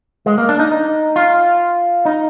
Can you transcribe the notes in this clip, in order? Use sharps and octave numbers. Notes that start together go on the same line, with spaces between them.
G#3
A#3
D4
D#4
D#4
F4
D#4